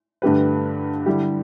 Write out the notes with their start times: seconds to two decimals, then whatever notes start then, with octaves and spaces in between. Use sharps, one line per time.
0.22 G2 D3 A3 G4 B4
1.06 D3 G3 E4 G4